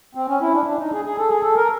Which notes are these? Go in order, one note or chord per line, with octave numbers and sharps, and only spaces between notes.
C4
C#4
E4
D4
D4
D#4
G#4
G#4
A4
G#4
A4
A#4